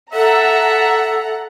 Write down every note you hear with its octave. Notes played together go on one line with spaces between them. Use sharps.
A4 E5 F#5 A#5